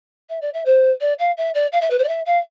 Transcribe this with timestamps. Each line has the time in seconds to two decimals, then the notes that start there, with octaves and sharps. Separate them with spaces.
0.29 E5
0.41 D5
0.53 E5
0.65 C5
1.01 D5
1.19 F5
1.37 E5
1.54 D5
1.72 F5
1.81 E5
1.90 B4
1.99 C5
2.03 D5
2.08 E5
2.26 F5